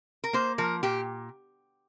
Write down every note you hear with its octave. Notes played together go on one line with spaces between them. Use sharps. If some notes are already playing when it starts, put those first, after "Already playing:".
A#4
A#3 C5
F3 A#4
A#2 G4